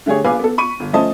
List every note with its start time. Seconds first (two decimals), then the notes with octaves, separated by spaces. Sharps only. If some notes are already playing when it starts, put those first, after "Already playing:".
0.06 D3 A3 G4 G#4 C#5
0.24 A#1 B4 F5 G#5 D6
0.39 B3 A4
0.58 B5 C#6 D#7
0.80 G1
0.93 F3 A3 C#4 C5 D#5 A5